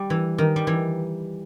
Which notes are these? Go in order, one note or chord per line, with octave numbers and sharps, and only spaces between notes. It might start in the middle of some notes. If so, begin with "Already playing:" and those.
Already playing: G3
E3
D#3
G3
E3